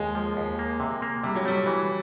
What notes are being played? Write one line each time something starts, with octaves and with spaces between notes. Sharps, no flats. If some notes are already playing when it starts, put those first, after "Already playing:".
Already playing: D#2 G#3
F3
D#2
A#3
C3
A#3
C3 G3
F#3
G3 A3
E3